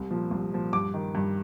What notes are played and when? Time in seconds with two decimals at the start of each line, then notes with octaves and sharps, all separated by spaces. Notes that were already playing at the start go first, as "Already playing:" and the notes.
Already playing: C2
0.10 A#2 F3
0.31 C2
0.52 A#2 F3
0.73 G2 D6
0.94 D#3
1.15 G2